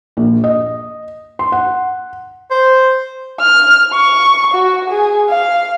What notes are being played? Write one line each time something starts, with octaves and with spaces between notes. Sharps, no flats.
A#1
D#5
C6
F#5
C5
F6
C#6
F#4
G#4
F5